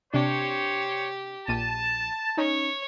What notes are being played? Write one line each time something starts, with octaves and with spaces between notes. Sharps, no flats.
C3 D4 G4 C5 C#5
A#1 A#2 A5 D#7
C#4 D#4 C#5